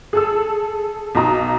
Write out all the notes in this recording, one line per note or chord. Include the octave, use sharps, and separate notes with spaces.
G#4 A4 E6
B1 D#4 A#5 D#6